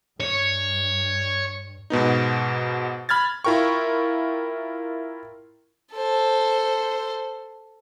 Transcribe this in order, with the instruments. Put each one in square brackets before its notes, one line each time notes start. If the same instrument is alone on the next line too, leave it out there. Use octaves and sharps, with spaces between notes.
[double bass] G2 [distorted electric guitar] C#5
[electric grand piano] G#2 B2 B3 D#4
B5 F6 G#6 A6
E4 F4 A#4 G5 C#6
[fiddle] A4 C5